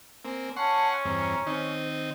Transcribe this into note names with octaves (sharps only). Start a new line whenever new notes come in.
A#3 C4 G#5
C#4 F#5 A5 C6 C#6
E2 G2 C4 A#5
D#3 C4 D#4 C5